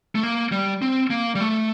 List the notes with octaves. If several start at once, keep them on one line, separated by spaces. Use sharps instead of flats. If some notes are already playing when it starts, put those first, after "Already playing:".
A3
A#3
G3
C4
A#3
G3
A3